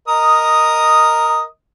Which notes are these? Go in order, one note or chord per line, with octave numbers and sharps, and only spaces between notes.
A#4 D#5 D#6